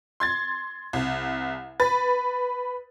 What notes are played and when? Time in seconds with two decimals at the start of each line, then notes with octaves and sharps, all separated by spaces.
0.20 C6 G#6 A6
0.93 C2
1.80 B4 A6